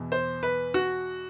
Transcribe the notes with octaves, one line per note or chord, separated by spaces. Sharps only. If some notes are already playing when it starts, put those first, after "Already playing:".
Already playing: E2 B2
C5
B4
F#4